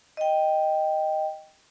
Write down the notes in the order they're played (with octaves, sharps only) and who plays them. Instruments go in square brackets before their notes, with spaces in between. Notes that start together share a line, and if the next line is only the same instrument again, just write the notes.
[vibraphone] D#5 G5